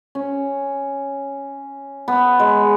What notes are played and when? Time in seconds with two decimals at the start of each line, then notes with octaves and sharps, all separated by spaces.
0.15 C#4
2.08 B3
2.39 G#3